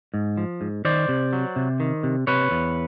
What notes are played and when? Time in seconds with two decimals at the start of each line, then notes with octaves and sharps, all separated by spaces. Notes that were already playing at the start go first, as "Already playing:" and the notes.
0.14 G#2
0.37 F3
0.61 G#2
0.85 D#3 C5 D5
1.09 C3
1.33 F#3
1.56 C3
1.80 D#3
2.03 C3
2.27 C3 B4 C#5
2.51 E2